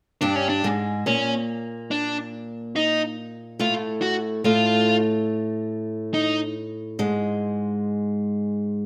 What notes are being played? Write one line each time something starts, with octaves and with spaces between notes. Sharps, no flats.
G2 G3 D4
C#4
D4
G#2 G#3
A#2 A#3 C#4
D4
D#4
A2 A3 F4
F#4
A2 A3 F4
D#4
G#2 G#3